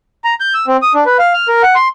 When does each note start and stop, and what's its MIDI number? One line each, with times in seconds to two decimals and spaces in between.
0.24 0.34 82
0.40 0.54 91
0.54 0.66 88
0.67 0.77 60
0.82 0.93 87
0.94 1.04 62
1.06 1.17 71
1.19 1.33 77
1.34 1.48 89
1.48 1.62 70
1.63 1.75 78
1.75 1.88 84